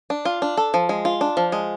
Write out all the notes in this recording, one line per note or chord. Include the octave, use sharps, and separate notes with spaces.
D4
F4
D4
A4
F3
G#3
F4
D4
F3
G#3